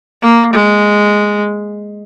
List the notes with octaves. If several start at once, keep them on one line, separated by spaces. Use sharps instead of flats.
A#3
G#3